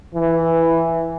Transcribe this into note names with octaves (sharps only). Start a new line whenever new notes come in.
E3